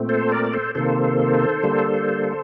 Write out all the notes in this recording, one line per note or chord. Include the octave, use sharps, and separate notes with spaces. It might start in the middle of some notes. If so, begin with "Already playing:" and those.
Already playing: A#2 A3 C4
A4 C5
A#4 D5
A4 C5
C3 D#3 A#3 A4 C5
D3 G3 A#3